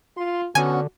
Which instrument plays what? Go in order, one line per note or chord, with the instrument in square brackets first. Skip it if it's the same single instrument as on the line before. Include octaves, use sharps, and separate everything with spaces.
[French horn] F4 [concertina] C6
[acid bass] D3 [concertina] B3 C#4 [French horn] F#4 [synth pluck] G#5